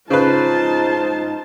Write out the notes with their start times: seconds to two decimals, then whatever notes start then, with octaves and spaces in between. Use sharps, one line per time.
0.10 G#2 C#3 D#4 F4 B4 C5 A5